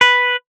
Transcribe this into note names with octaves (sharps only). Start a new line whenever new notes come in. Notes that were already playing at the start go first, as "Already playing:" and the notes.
B4